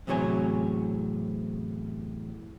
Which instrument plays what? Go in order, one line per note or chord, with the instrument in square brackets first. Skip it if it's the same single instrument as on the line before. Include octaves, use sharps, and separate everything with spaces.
[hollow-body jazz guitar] E2 A2 C3 F#3 C#5 G#5